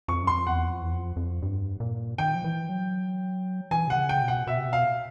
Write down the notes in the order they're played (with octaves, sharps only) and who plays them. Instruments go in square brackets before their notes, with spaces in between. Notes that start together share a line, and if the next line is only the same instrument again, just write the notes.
[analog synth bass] F2 [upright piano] C#6
[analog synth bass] F#2
[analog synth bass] F2 [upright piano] C6
[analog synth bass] E2 [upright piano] F#5
[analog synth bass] F2
E2
F2
F2
G2
A#2
[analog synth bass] D#3 [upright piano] G5
[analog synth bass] F3
E3
F#3
[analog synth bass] E3 [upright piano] G#5
[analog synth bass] C3 [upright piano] F#5
[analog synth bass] C#3
[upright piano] G5
[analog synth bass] B2
[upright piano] F#5
[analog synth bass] B2 [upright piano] E5
[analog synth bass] C3
[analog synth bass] B2 [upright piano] F5